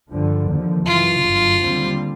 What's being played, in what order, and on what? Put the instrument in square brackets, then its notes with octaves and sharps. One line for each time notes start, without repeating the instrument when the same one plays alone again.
[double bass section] G2 D3 F3
D#2 D3 F3
[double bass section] F#2 C#3 E3 [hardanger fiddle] F4
[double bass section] G1 F#2 D3
D#2 D3 G3 C4